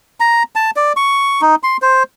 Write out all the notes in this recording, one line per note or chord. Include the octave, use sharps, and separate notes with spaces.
A#5
A5
D5
C#6
D#4
C6
C5